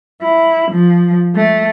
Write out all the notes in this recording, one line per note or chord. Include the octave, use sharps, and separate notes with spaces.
E4
F3
A3